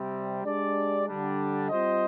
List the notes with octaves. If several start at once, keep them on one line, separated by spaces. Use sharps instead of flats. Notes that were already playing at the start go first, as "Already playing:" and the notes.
Already playing: C3 G3 C4
G#3 D4 G4 D5
D3 G3 D4
G3 C4 F4 C5 D#5